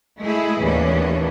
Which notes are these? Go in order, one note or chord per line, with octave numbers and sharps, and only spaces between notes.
G#3 A3 E4 G#4
D#2 A2 E3 A#3 C#4 D4